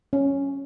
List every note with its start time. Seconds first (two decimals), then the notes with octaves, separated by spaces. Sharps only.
0.13 C#4